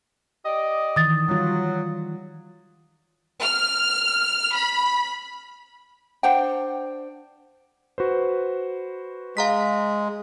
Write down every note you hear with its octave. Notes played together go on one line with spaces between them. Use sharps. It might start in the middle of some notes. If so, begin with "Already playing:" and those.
G4 D5 D#5
D#3 E3 D#6 A6
F#3 G3 F4
F6
B5
D4 C5 F#5 G5
F#4 B4 C5
G#3 F5 A#5 B6